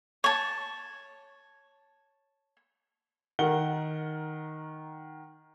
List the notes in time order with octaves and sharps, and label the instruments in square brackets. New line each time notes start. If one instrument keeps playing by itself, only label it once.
[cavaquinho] C#5 A5
[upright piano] D#3 A#4 F#5 G7